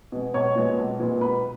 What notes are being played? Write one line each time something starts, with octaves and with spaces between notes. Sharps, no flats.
B2 G#3
B1 C#5 C#6
A#2 G#3 B3
B1
A#2 G#3 B3
B1 B4 B5